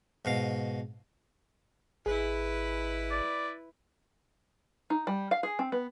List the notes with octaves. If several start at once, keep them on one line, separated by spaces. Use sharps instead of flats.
G#2 B2 F5
G#1 E4 G#4 B4
D5
D#4
G3
F5
G#4
C4
B3